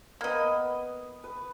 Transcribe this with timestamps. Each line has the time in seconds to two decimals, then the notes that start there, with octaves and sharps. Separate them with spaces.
0.21 A#3 B3 D#5 B5
1.24 B4